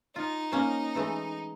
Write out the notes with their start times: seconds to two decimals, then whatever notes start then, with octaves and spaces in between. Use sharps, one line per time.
0.16 D#4 F4
0.52 A#3 C#4 C5
0.95 E3 G#3 A3